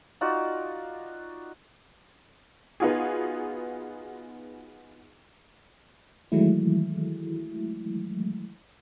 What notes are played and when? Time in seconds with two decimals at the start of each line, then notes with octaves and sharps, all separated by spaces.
0.21 D#4 F4 F#4 D5
2.80 B3 D#4 F4 F#4 G#4
6.32 D#3 E3 F#3 G#3 A3 E4